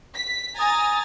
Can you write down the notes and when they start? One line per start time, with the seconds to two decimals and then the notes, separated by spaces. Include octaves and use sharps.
0.15 B6
0.59 G#5 A#5 D#6 A6